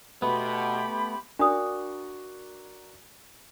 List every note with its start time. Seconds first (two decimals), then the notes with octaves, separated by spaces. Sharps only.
0.22 B2 A3 B3 G4 B5 C6
1.39 D4 F#4 A#4 D5 D#6